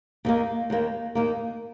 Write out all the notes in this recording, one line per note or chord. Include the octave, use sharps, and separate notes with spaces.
D#2 D#3 A#3
D#2 D#3 A#3
D#2 D#3 A#3